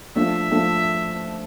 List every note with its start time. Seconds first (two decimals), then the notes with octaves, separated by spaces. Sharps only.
0.15 F3 A3 D4 E5
0.51 F3 A3 D4